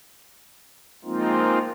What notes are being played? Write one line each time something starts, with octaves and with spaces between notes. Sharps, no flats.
F3 G#3 A#3 C4 D#4 F4